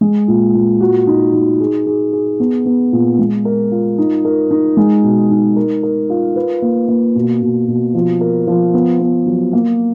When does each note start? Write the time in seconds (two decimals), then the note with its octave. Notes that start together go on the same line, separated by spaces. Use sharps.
0.01 G#3
0.28 A#2
0.54 A#2
0.81 F#4
1.07 D#4
1.33 D#4
1.60 G#4
1.86 G#4
2.13 G#4
2.40 B3
2.66 B3
2.92 A#2
3.19 G#3
3.45 A#4
3.71 F4
3.98 D#4
4.25 A#4
4.51 D#4
4.77 G#3
5.03 B2
5.30 D#4
5.56 A#4
5.83 A#4
6.10 F4
6.36 B4
6.62 A#3
6.88 A#3
7.15 B2
7.42 B2
7.68 B2
7.95 F3
8.21 A#4
8.47 F3
8.74 B3
9.00 B3
9.26 F#3
9.53 A#3